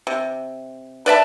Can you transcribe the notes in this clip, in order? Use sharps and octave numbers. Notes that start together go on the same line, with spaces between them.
C3
B4 D5 E5 A5